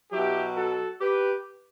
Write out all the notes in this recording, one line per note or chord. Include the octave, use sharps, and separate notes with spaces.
B2 F#3 E4 G4
F#4 A4
G4 B4